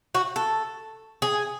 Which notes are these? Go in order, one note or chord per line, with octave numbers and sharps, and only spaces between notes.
F#4
A4
G#4